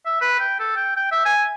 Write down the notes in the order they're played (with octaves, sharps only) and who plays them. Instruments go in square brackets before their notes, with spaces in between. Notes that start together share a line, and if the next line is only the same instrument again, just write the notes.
[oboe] E5
B4
G5
A4
G5
G5
E5
G#5